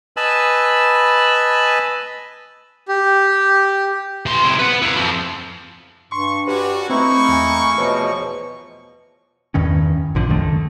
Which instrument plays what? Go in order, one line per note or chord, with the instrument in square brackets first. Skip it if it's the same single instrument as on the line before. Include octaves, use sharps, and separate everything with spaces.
[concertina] B4 D#5 G#5 A5 B5 E6
[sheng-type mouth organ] G4
[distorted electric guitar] E3 C6
C3 E4
B4 F#5
E4 F5
F2 F3
[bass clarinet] G2 [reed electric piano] C6 [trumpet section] C#6
[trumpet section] C#4 D4 F#4 [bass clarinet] G4 [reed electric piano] B4
[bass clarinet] A3 [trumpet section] A#3 C#6 [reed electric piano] C4 [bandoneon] D#4 E4
[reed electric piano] E2 G#5
[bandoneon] E2 B2 F3 [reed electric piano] B4 C#5 D#5
[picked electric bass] E2 G2 D#3 C#4
A#1 G2 D3 F3
C#2 F#2 D#3 A3